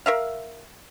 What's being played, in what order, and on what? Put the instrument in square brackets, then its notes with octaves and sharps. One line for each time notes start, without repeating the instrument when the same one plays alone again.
[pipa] A#4 E5 F5